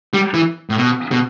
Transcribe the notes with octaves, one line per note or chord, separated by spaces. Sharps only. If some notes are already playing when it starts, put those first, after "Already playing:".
G3
E3
A2
B2
B2